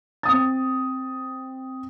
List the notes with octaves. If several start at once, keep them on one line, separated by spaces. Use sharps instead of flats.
C4 D#6 A6